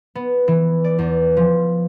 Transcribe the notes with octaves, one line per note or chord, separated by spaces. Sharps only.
B3
E3
D5
E2
F3